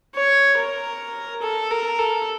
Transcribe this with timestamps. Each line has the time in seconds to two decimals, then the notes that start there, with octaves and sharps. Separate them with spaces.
0.15 C#5
0.57 A#4
1.42 A4
1.71 A#4
1.99 A4